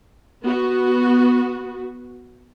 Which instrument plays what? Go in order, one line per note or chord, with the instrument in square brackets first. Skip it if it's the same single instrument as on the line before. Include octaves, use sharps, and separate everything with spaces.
[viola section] B3 F#4